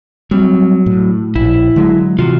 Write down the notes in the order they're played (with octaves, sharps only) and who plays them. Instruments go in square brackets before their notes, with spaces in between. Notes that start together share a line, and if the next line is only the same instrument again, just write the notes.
[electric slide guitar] F#3 [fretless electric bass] G3 C4
[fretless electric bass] A2
[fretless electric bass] A#1 [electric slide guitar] E4
[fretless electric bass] D3 F#3 G#3
[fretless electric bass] C3 E3 [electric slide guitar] F4 F#4